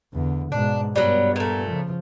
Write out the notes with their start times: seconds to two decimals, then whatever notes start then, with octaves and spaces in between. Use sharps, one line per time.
0.13 E2 D3
0.52 G#2 B2 D4
0.96 G2 F#3 G3 B3
1.36 A#2 A3
1.67 C#3 F3